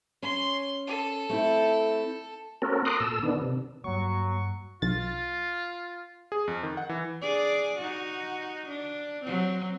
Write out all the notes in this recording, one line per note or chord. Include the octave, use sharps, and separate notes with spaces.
C#4 C6
A4
A3 C4 E4
A#3 C4 C#4 F#4 A4 A#4
A#5 C6 D6 D#6 F#6
A#2 A4 E6
D#3 B3 D4
C3
G2 F#3 G3 A#3 C#6
B1 F4 A6
G#4
F2
D#3
F#5
E3
D4 G#4 D5
D#4 F#4
D4
F#3 C4